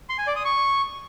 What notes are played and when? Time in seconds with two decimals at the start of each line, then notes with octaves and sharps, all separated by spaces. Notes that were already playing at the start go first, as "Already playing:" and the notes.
0.09 C6
0.18 G#5
0.27 D5
0.36 D#6
0.45 C#6